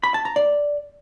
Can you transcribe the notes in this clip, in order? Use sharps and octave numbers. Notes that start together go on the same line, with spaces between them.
B5
A5
A#5
D5